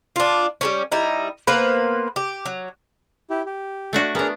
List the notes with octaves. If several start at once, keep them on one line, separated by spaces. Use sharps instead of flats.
D4 F4
G3 A3 C#4
G3 D#4 E4
A#3 B3 B4 C5
G4
F#3
E4 G4
G4
A3 D4 F#4
B3 D4 G#4 A#4 A#5